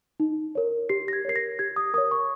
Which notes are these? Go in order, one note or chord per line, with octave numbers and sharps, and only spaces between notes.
D#4
A#4 C#5
G4 C7
A#6
G#6
A#4 C#5 C7
A#6
G4 G#6
D#6
A#4 C#5 D#6
C#6